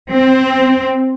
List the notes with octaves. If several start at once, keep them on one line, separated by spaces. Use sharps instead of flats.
C4